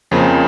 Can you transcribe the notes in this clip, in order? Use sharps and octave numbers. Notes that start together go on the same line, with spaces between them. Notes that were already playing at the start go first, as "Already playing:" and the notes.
F2 C#3 F3 A#3